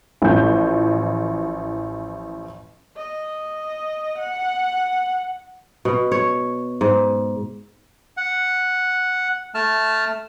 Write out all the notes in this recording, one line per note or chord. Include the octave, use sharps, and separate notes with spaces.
A1 E3 F3 G6
D#5
F#5
B2
C#5
G#2
F#5
A3 A5 F6